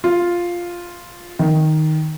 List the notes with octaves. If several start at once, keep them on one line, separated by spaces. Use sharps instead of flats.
F4
D#3